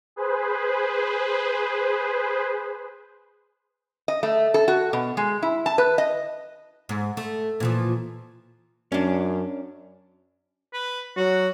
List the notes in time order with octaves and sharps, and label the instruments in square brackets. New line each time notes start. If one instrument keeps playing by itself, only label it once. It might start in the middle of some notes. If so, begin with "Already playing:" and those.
[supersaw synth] G#4 B4 C5
[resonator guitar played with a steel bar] D#5
A3
A4
F#4
B2
G#3
E4
A5
B4
D#5
[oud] G#2
A3
A#2 E3 F3
[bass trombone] F#2 [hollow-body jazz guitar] C#4 D4
[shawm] B4
[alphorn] F#3 [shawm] F#4